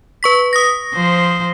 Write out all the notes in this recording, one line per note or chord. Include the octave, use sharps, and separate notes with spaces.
B4 C#6 B6
D#6 A#6
F3 C5